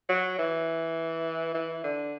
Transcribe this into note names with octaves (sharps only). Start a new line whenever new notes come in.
F#3
E3
E3
D3